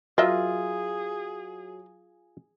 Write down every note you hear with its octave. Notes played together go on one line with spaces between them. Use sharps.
F#3 F4 G#4 A#4 D#5 E5